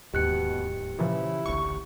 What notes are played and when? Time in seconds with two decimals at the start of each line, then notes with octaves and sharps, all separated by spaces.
0.14 D1 D#2 G#2 B2 G4 F#6 C#7
0.99 A#2 C#3 E3 F3 E4
1.46 D1 A1 D2 C#6